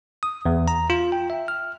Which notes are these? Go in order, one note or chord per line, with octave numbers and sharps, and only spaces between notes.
D#6
E2
A#5
F4
G5
E5
F6